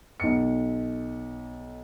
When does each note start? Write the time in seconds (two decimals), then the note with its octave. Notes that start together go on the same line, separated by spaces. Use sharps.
0.20 B1 C#7